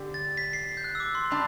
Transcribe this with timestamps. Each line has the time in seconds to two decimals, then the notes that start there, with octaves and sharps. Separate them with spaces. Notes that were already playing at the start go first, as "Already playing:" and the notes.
Already playing: D3 G4
0.14 A6
0.37 B6
0.53 C7
0.69 B6
0.77 G6
0.84 F#6
0.95 E6
1.00 D6
1.15 C6
1.31 G3 D4 B5